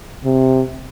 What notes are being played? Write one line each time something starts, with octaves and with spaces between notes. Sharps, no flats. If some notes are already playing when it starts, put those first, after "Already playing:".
C3